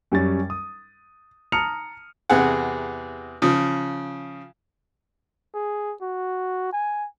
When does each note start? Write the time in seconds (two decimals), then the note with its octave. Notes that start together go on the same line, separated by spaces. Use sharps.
0.12 F#2 G3 C#4 A6
0.50 D#6
1.52 A5 A#5 D#6 F6 C#7 F7
2.29 E2 C3 G#4 F#5
3.42 C#3 F3
5.54 G#4
6.02 F#4
6.72 G#5